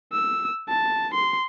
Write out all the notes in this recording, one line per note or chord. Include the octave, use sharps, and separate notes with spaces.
E6
A5
C6